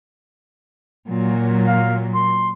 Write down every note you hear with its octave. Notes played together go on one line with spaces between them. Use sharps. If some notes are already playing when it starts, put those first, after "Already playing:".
A#2 F#3
F5
C6